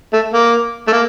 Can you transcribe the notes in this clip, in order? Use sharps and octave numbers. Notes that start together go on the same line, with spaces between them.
A3
A#3
A3
A#3